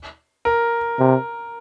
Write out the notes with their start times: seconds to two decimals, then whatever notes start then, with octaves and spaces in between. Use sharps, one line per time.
0.45 A#4
0.99 C3